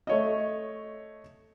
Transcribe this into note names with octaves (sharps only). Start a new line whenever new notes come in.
A3 C#5 D#5